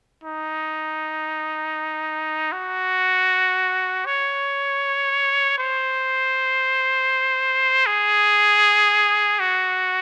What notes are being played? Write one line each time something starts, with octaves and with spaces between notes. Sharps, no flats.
D#4
F#4
C#5
C5
G#4
F#4